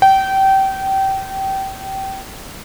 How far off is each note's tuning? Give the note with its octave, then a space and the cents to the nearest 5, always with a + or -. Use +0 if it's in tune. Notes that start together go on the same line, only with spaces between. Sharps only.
G5 -25